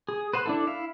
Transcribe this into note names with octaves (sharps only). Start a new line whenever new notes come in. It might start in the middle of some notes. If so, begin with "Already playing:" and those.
G#4
B4 C5 F#5
D4 E4 A4
E4 F5